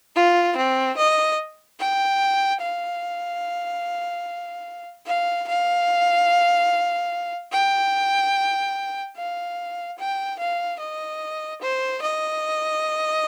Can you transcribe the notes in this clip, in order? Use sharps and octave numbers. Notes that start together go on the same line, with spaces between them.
F4
C4
D#5
G5
F5
F5
F5
G5
F5
G5
F5
D#5
C5
D#5